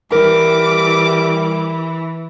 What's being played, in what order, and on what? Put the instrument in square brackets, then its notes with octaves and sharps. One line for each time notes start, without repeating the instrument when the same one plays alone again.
[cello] E3 [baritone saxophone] G3 [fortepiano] A#4 [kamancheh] D6